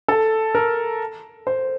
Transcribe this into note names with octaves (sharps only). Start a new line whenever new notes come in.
A4
A#4
C5